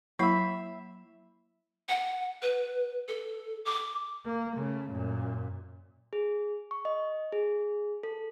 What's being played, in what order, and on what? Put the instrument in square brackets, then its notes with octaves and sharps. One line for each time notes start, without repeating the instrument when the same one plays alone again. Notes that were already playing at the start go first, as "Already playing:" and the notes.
[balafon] F#3 A#3 E4 [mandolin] E5 B5
[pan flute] F#5
B4
A4
D6
[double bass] A#3
C#3 A3
F#2 A#2
[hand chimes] G#4
C#6
D#5
G#4
A4